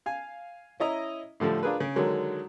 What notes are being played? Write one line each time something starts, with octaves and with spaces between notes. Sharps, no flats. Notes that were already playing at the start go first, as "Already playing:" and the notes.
F5 G#5
C#4 E4 D#5 A#5
A2 D3 F3 G3 A3
D4 F4 G#4 A#4 B4
C#3
D3 D#3 F#3 G#3